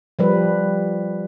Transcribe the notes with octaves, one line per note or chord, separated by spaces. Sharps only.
F3 G3 B4